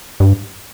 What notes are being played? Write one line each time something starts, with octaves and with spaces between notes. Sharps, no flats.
G2